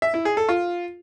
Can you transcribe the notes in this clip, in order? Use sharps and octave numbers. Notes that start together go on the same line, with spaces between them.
E5
E4
G#4
A4
F4